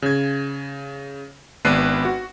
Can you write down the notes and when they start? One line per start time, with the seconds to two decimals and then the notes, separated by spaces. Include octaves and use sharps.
0.02 C#3 G#6
1.65 G#1 B3 D4 B4 C7 D#7
2.05 F#4